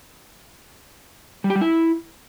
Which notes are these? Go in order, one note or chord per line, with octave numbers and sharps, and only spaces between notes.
G3
G4
G3
E4